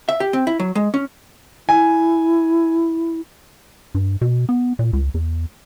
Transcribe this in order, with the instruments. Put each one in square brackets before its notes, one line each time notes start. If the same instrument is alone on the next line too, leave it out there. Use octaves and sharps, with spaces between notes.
[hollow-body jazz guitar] E5
G4
C4
E4
F#3
G#3
C#4
[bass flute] E4 [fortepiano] G#5
[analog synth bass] G2
B2
B3
A#2
C#2
E2